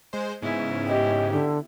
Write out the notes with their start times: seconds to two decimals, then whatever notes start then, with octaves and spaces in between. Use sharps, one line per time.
0.13 G#3 C5
0.42 G#2 C#3 B3 E4
0.88 G4 D#5
1.32 D3